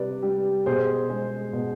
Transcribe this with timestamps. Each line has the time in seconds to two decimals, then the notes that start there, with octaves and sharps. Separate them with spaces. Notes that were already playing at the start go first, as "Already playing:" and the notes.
Already playing: C3 G3 B4 D5
0.23 G3
0.66 B2 G#4 C5
1.09 G#3
1.53 B2